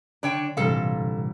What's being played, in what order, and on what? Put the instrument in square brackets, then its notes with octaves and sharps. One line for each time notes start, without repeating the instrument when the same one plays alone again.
[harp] D3 [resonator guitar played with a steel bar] D4 C#5 G5
[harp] A#1 G3 A#5 [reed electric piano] G#2 C3 E3 [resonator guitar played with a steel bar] A4 F5